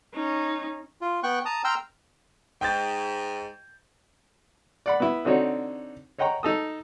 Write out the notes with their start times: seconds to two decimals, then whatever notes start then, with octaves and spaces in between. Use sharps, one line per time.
0.14 C#4 D#4
1.01 F4
1.23 B3 G5 C#6 F#6
1.45 A5 A#5 D#6
1.64 G5 A#5 C6 E6 F6
2.61 G#2 G5 G6 A6
4.86 D5 F#5 B5
5.00 B3 E4
5.25 D3 C4 D4 D#4 F#4 C#5
6.19 C#5 D#5 F#5 G5 A#5 C#6
6.43 D#4 A4 D#6